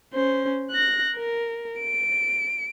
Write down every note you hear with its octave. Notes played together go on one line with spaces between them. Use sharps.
C#4 C5
F#6 A#6
A#4
D7